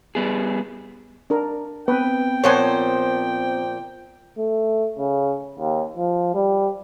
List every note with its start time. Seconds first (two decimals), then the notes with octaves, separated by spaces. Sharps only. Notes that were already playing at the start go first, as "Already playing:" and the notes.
0.15 G3 B3 G#4
1.30 D4 A#4
1.88 B3 C4 B4 G5
2.44 A#2 F3 C5 C#5 F#5 G#5
4.37 A3
4.98 C#3
5.58 D#2
5.97 F3
6.34 G3